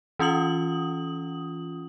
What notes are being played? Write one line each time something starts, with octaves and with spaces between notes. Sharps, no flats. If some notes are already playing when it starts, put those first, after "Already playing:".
E3 C#4 F4 D#6 F#7